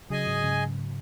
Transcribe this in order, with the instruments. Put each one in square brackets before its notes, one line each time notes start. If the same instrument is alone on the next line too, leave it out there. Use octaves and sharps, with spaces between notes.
[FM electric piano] C#3 F#3 [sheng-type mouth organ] G#4 D#5 G#5
[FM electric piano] G#2 C#3
G#2 C#3